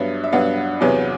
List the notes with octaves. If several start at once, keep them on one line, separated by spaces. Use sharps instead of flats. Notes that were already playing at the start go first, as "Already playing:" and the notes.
Already playing: G2 F#3 B3 E5
E5
G2 F#3 B3 F#5
E2 C3 F#3 B3